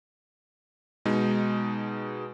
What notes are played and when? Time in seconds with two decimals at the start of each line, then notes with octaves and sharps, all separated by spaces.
1.05 B2 G#3 D#4